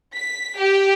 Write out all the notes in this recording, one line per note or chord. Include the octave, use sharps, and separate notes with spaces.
B6
G4